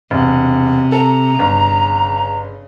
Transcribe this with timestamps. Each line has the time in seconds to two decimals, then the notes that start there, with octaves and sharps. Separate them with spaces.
0.11 E1 C3
0.92 A4 A#5
1.39 G1 C#3